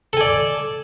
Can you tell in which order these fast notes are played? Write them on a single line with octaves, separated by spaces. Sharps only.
A4 G#5 D5